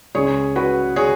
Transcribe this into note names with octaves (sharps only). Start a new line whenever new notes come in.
C#2 C#3 G#4 C#5
F#4 B4
G#4 C#5